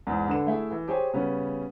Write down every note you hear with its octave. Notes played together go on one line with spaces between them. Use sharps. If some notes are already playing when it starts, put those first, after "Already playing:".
E2 G#2
D3 D4 A4 B4 E7
A3 E4 G#4
E3
G4 G#4 C5 C#5 G#5
C#3 G3 B3 C#4